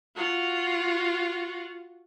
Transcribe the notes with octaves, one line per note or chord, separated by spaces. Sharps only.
F4 F#4